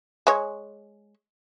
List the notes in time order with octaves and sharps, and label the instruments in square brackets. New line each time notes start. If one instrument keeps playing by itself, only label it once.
[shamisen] G#3 C#5